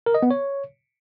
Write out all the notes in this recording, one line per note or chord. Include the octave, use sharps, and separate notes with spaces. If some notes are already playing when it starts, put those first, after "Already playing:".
A#4
D#5
B3
C#5